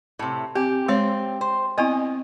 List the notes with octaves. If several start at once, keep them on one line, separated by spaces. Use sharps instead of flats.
A2 C3
C4 G4
G#3 C4 C#5
C5
B3 C4 E4 D#5